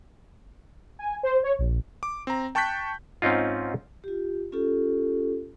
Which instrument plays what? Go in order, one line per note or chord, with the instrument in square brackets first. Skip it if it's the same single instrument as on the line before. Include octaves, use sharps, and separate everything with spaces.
[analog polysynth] G#5
C5
C#5
A#1
[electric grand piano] D6
C4 A#5
G5 A5 C#6 F#6 G6 B6
[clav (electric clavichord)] G#2 C4 C#4 D#4 F4
[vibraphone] F4 G4
C#4 F4 G4 A4